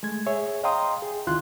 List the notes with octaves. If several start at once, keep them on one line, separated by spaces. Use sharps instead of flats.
G#3 A3 G#6
G#4 C#5 E5
D#5 F5 G5 A#5 C6 D#6
G#4
C#2 D#3 E4 F4 C6 F#6